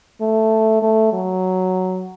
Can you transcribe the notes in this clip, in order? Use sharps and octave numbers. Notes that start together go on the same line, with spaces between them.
A3
A3
F#3